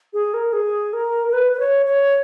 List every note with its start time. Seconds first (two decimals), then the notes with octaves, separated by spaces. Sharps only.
0.14 G#4
0.34 A#4
0.53 G#4
0.93 A#4
1.28 A#4
1.33 B4
1.53 B4
1.60 C#5
1.86 C#5